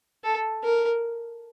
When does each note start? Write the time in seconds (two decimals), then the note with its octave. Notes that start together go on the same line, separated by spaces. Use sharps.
0.24 A4
0.64 A#4